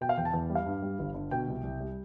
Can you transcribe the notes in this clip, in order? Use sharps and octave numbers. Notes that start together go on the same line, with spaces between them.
B2 G5
F5
E2 G5
A5
E2
G3
F5
G2
G3
G1
D3
B2 G5
C2
C2
G3